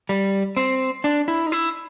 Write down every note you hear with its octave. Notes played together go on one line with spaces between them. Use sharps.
G3
C4
D4
E4
D#4
E4